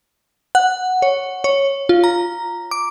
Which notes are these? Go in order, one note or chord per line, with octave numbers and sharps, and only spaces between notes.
F#5
C#5
C#5
F4
A#5
D6